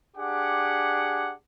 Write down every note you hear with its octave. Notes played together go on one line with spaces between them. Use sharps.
D4 G4 G#4 F#5 D6